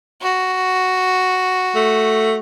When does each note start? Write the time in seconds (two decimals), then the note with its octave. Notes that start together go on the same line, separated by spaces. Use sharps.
0.22 F#4
1.75 A3